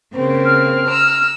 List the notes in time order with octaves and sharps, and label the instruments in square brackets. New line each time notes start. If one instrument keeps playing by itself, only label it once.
[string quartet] C#3 A#3 C4
[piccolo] F6
[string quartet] A#5 E6